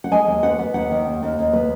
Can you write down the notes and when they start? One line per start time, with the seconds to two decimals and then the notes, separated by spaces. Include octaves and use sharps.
0.04 F#5
0.11 G#3 G#5
0.27 D#2
0.43 B3 F#5
0.59 B3
0.74 D#2 F#5
0.91 D#3
1.06 D#2
1.23 D#2
1.39 D#2
1.53 B3